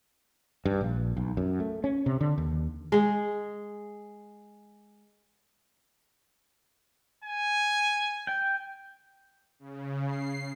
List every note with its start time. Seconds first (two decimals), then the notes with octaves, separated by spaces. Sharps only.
0.65 G2
0.81 A#1
1.17 B1
1.37 F#2
1.60 A3
1.84 C#4
2.06 C3
2.21 D3
2.38 D#2
2.92 G#3 G#4
7.24 G#5
8.27 G5
9.59 C#3
10.06 C7